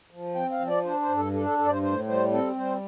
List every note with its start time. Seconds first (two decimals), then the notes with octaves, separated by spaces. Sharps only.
0.11 F3
0.35 C4 G5
0.51 F5
0.60 F3
0.67 D5
0.84 D4 C5
1.01 C5
1.09 G2
1.17 A4
1.33 D4 A4
1.46 A4
1.58 G2 A4
1.66 D5
1.70 C5
1.82 A2 C5
2.07 G3 C5
2.31 C4 A4
2.56 G3 C5